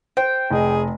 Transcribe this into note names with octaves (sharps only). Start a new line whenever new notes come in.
C5 G5
F1 G#4 D#5